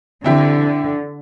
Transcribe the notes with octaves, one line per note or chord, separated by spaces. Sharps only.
D3 C4 E4 G4